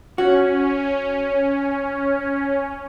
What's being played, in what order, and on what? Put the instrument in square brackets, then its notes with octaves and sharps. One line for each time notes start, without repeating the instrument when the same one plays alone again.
[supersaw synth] C#4 [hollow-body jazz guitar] F#4